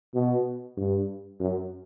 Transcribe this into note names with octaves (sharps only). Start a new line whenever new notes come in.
B2
G2
F#2